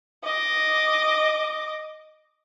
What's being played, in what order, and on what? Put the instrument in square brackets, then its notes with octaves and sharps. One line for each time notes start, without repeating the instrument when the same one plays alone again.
[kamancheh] D#5 D6